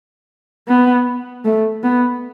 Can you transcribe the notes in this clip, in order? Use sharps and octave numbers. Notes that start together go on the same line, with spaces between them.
B3
A3
B3